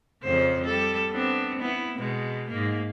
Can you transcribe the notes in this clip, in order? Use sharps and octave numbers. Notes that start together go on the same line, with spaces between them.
F2 C#3 C5
G3 A4
B3 C4 D4
B3 E4
B2 G#3
G#2 A#3